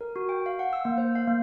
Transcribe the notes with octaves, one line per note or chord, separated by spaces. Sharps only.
A#4
F#4
G5
F5
F#5
E6
A#3
C5
F5
A#3